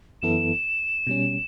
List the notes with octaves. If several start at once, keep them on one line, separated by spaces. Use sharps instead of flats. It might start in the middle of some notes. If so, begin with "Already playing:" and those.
F#2 E3 B3 E4 A4 E7
B2 G3 C#4